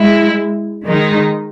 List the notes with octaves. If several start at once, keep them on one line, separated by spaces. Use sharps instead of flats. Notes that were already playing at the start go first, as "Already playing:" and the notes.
Already playing: G#3 E4
D#3 G#3 D#4